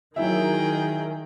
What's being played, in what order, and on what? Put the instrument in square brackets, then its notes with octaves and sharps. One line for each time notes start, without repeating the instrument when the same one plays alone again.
[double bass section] D#3 [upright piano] F#3 E4 E5 [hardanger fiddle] G#4 G5